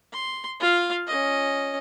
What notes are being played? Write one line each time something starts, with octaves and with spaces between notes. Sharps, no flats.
C6
F4 F5
C#4 D#5